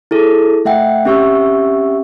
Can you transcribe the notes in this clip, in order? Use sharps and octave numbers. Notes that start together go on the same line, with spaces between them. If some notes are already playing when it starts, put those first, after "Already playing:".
E4 G#4 A4
A3 E5 F#5 G5
C4 C#4 G4 E5 C#6 E6